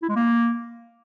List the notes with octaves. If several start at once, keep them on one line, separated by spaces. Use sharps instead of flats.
E4
G#3
A#3